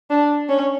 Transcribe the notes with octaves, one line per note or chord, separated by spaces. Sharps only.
D4
C#4